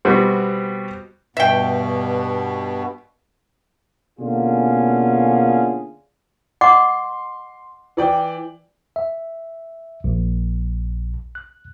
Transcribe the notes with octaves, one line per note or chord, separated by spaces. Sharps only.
B2 G3 C4 F#4
G2 B2 B3 E5 G5
B2 D3 A#3 C#4 F4 G#4
D#5 F#5 C6 D6
E3 D5 G5
E5
A#1
F#6